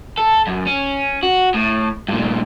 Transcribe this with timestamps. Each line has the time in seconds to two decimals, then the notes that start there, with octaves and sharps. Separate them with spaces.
0.18 A4
0.47 F#2
0.67 C#4
1.23 F#4
1.55 A2
2.08 G2 A#2